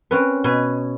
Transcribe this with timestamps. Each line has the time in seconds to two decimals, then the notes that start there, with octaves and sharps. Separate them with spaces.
0.11 C4 C#4 B4
0.44 B2 B4 G#5